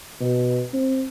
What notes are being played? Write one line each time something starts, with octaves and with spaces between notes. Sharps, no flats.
B2
C4